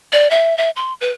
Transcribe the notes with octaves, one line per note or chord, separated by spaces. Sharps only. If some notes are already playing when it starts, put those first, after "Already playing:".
D5
E5
E5
C6
B4